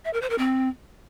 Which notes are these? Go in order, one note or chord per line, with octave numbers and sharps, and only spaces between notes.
E5
A#4
C5
A#4
C4